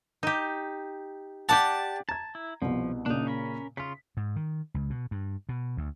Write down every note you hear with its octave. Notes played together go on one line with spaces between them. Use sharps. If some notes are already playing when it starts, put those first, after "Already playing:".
D#4 G4
G4 D5 F#5 A5
A5 A#5 G#6
E4
C2 B2 F3
A#2 C#3 D4 D#4
C#4 A#4 B5
C#3 F4 B6
G#2
D#3
C#2
B2
G2
B2
D2